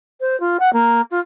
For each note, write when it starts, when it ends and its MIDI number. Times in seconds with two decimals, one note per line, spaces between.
0.21 0.39 72
0.40 0.57 65
0.60 0.72 78
0.73 1.01 58
1.11 1.20 65